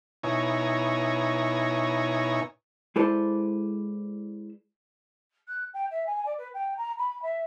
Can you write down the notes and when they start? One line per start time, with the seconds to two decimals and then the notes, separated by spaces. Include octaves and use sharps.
0.23 B2 D#4 E4 C#5 G#5 A#5
2.96 G#3 E4 A4 B4 C5 D5
5.47 F#6
5.73 G5
5.90 E5
6.06 G#5
6.25 D5
6.38 B4
6.54 G5
6.77 A#5
6.98 B5
7.22 E5